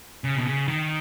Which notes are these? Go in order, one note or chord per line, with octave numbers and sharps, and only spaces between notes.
C#3
B2
C#3
D#3